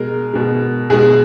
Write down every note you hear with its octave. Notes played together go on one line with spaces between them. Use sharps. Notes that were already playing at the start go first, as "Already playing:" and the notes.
Already playing: B2 G#3 A#4
B2 G#3
B2 G#3 G#4